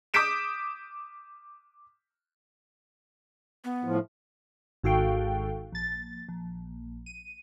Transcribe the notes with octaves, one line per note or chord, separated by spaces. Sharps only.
D6 D#6 G6 B6 D7 E7
B3
A2 F3
G#1 G#2 F#4 A4 F5 G5
A#1 A6
A#1
D#7